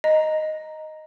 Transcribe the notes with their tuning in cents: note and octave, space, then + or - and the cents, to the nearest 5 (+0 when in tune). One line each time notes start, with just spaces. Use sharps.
D#5 +0 A#5 +5